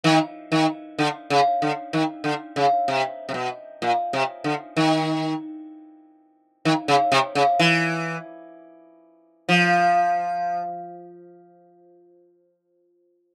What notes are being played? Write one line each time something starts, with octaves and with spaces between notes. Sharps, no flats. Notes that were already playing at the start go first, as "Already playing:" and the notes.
D#3
D#3
D3
C#3
D3
D#3
D3
C#3
C3
C3
B2
A#2
C3
D3
D#3
D#3
C#3
C3
C#3
E3
F3